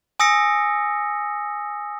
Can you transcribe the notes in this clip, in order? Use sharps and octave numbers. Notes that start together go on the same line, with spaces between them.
G#5 D#6 E6 A#6 C#7